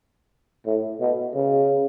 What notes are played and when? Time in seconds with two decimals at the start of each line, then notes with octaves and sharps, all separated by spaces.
0.66 A2
1.01 B2
1.35 C#3